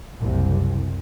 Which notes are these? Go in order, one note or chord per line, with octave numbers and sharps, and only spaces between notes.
F#1 C2 C3